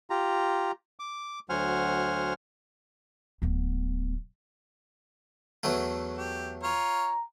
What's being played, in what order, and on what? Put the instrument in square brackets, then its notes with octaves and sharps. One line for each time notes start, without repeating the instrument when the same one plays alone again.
[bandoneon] F4 G4 A#5
D6
D2 F#3 C5 F#5 G#5 F6
[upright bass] D1 B3
[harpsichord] E2 F#3 A3
[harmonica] G4
[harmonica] F4 C#5 [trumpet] A#5